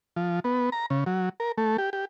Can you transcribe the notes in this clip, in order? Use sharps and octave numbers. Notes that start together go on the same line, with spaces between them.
F3
B3
A#5
C#3
F#3
A#4
A3
G4
G4